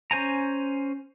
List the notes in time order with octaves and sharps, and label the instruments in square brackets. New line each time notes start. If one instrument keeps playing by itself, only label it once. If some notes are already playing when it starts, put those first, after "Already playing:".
[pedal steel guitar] C#4 C5 G#5 A#5